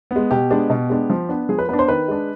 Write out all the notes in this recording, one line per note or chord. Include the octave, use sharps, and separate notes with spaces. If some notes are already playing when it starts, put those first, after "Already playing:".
B3
G#3
B2 G4
G#3 B3 D4
B2
G#3 B3 D4
F3
B3 D4
F3 G#4
B4
B3 D4 B4
C5
D#3 B4
G#3 D4